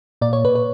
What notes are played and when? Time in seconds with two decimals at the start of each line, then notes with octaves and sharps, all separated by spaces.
0.21 A#2 D5
0.33 C#5
0.44 A#2 B4
0.55 B4